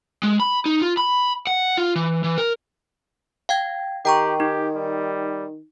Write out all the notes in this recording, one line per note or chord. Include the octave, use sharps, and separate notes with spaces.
G#3
B5
D#4
F4
B5
F#5
F4
E3
E3
A#4
F5 G5 G#6
D#3 G4 G5 A#5 C#6
D#4 G4
G3